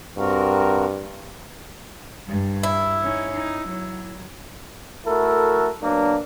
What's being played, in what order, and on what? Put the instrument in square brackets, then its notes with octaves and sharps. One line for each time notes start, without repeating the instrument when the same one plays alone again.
[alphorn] G2 [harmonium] C4 F#4 A#4
[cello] G2
[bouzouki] E4
[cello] C#4 D#4
D#4
F#3
[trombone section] A3 E4 F#4 A4 A#4
F#3 A#3 B3 D4